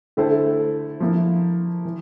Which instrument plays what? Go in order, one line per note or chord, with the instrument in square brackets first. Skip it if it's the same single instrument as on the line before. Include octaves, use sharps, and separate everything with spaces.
[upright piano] D3 A3 E4 A4 C5
F3 A#3 E4
E3